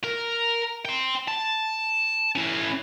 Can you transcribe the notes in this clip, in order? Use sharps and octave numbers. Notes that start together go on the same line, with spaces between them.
A#4
G5 C6
A5
C#4 E4